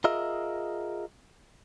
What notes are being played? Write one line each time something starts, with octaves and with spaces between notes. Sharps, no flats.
F4 G#4 A#4 D#5 E5